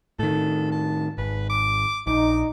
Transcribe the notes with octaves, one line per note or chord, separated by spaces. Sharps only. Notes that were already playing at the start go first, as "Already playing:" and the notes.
A2 D#3 A4
A5
G#1 B4
D6
A#1 D#4 D6